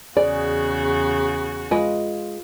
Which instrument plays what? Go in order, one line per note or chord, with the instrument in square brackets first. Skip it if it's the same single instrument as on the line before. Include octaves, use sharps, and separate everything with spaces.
[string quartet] E2 C#3 F#4 [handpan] G#4 [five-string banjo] D5
[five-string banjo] G#3 B4 D#5 [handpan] F4